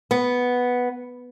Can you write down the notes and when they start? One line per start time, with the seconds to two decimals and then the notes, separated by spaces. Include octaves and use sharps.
0.11 B3